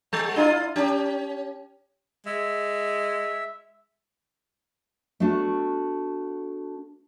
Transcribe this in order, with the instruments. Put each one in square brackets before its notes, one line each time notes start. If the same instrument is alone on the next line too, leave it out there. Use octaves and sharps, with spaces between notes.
[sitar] G3
D4 E4 F4
C#4 G4
[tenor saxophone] G#3 [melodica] E5
[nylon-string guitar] A3 B3 D4 F#4 A4